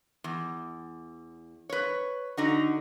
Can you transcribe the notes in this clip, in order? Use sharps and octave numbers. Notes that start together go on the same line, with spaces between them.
E2
B4 C#5
D3 D#4 F#4